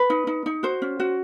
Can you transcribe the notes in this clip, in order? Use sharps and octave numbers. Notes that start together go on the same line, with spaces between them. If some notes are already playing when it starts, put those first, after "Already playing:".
Already playing: B4
D#4
D#4
D#4
F#4 C5
C#4
F#4